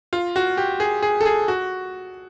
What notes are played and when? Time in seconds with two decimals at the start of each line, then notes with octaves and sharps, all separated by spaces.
0.13 F4
0.36 F#4
0.57 G4
0.80 G#4
1.02 G#4
1.21 A4
1.25 G#4
1.48 F#4